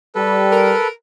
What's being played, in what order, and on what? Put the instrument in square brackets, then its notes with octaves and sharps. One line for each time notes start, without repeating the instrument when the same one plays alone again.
[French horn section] G3 [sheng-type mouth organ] A4 B4
[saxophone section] A#4